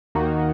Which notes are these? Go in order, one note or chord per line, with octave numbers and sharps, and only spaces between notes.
D#2 D#3 A#3 D#4 F#4